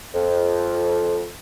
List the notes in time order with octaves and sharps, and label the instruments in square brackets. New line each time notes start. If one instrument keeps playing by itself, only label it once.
[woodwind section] F2